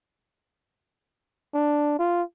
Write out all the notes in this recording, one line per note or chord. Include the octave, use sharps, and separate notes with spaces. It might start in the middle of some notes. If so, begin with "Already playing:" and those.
D4
F4